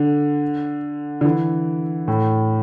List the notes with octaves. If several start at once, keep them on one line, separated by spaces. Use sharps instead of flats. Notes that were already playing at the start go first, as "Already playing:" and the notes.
Already playing: D3
D3
E3
A2